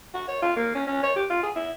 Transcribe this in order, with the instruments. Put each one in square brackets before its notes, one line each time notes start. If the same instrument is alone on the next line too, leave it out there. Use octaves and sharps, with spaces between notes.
[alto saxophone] F#4
C#5
F4
A#3
C#4
C#4
C#5
G4
F4
G#4
E4